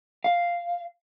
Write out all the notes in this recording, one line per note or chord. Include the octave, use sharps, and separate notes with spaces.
F5